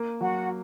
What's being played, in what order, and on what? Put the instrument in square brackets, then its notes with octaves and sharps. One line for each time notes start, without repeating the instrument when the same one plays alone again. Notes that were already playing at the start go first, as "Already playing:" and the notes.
Already playing: [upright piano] A#3
[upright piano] F#3 [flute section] F#4 F#5